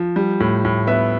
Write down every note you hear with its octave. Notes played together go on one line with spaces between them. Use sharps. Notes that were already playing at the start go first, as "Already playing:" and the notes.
Already playing: F3
G3
A2
A2
B3 E5